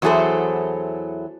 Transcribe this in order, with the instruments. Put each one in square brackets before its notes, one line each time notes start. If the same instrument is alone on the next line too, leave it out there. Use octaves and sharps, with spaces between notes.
[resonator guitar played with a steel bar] E2 F#3 E4 G#4 A4 C5